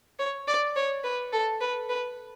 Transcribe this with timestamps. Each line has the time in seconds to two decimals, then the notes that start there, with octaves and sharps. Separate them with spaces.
0.19 C#5
0.47 D5
0.76 C#5
1.04 B4
1.33 A4
1.60 B4
1.89 B4